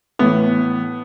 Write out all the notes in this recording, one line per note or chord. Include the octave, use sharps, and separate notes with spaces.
A2 E3 B3